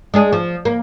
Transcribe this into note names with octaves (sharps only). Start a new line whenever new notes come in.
G#3 D4 G#4
F3
A#3